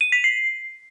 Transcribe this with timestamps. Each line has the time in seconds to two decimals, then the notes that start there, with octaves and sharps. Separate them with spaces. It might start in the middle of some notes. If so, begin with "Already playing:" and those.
0.01 D#7
0.12 B6
0.24 C7